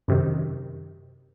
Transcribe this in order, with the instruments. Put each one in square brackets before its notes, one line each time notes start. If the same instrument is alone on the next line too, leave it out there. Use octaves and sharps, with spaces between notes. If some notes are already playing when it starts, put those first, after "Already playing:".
[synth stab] F#2 C3 D#3